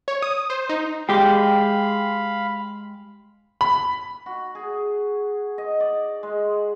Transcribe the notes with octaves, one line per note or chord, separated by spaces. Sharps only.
C#5
D#6
C5
D#4
G#3 G4 F5 G5 B5
B5
F#4
G#4
D#5
D5
G#3